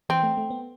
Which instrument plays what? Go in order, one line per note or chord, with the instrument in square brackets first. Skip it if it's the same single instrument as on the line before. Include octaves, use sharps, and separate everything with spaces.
[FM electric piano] E3 [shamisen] C4
[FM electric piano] A3
A3
B3